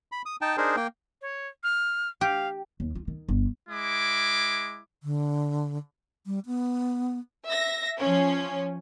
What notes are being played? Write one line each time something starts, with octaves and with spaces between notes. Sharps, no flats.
B5
D#6
D#4 G5 A5
D4 D#4 G#4 A#4 C5
A#3 G5
C#5
F6
G4 F5
D#2
F4
D#3
G1
G#3 E4 D6
D3
G3
B3
E5 A#6
F3 C#4